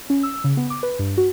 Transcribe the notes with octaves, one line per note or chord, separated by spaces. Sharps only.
C#4
E6
C#3
B3
D6
B4
G2
F#4